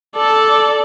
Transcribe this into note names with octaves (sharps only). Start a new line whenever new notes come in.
A4 D5